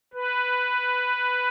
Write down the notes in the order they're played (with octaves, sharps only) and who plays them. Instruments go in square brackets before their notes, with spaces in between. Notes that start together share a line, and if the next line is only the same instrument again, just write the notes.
[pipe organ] B4